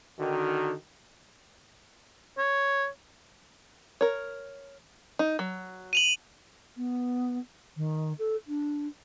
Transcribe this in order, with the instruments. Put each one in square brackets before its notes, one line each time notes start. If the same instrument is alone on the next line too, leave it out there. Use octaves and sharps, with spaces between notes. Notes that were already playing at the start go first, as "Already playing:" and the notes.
[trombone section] D3 D#3 [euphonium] F#4
[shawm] C#5
[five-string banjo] A#4 C#5
D#4
F#3
[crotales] D#7 F7 F#7
[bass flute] B3
D#3
A4
D4